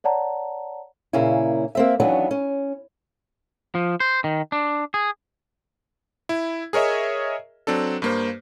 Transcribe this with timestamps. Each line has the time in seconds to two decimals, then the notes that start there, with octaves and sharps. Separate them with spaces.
0.04 C#5 D5 F#5 A5 A#5
1.13 A#2 C#3 A#3 C#4 E4
1.75 A#3 C4 E5
2.00 D#2 E3 F#3 B3 C#4 D4
2.31 C#4
3.75 F3
4.00 C5
4.24 D#3
4.52 D4
4.94 G#4
6.29 E4
6.73 G#4 A#4 C#5 D#5 E5
7.67 F#3 C4 D4 A4
8.02 G2 A#3 C5